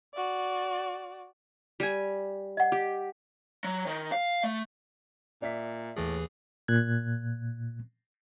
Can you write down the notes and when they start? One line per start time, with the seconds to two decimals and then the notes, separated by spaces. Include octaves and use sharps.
0.14 F#4 D5
1.80 G3 G#5
2.57 D#5 F#5
2.72 G4
3.64 F#3
3.87 D#3
4.12 F5
4.44 A3
5.42 A#2 D5 E5 B6
5.96 D#2 A2 E3 G#4
6.68 A#2 F#6 G#6